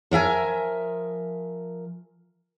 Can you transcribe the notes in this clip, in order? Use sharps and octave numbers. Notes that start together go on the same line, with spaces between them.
F3 A#4 E5 G#5